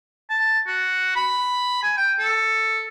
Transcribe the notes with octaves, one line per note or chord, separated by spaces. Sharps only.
A5
F#4
B5
G#5
G5
A4